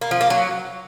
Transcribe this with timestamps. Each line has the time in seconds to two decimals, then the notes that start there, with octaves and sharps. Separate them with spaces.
0.01 A#3
0.11 F3
0.21 A#3
0.30 F#3